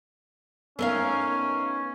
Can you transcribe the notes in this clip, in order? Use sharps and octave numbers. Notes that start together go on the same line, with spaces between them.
A3 B3 C#4 D#4 A#4 F5